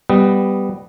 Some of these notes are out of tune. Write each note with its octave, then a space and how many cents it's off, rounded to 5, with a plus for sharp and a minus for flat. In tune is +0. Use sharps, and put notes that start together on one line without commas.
G3 +0 B3 +5 D#5 +0